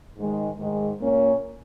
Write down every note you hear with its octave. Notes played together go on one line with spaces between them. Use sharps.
G#2 D#3 G#3
G#2 D#3 G#3
A#2 A#3 C#4